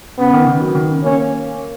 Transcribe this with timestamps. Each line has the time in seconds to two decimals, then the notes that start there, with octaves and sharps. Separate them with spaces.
0.18 C#3 B3
0.33 D#3
0.46 D#3
0.61 F#3
0.75 D#3
0.89 C#3
1.04 A#3 C#4